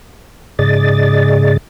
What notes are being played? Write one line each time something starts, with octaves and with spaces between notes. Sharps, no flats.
G#2 C#3 G#4 D5 D#5 A6